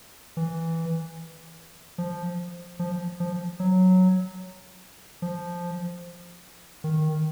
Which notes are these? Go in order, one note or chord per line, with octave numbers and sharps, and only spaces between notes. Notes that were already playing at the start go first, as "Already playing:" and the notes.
E3
F3
F3
F3
F#3
F3
D#3